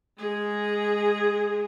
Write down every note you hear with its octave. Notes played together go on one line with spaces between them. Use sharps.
G#3 G#4